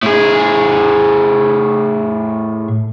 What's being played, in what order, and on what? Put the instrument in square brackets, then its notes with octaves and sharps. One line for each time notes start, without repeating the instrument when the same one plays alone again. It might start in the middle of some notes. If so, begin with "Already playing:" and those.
[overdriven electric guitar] A2 G#4